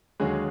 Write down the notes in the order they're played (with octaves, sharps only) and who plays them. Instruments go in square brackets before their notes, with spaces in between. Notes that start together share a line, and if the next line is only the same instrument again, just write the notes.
[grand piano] D#2 D3 F#3 G#3 G#4